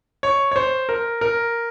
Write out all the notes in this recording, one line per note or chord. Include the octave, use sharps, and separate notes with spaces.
C#5
C#5
C5
A#4
A#4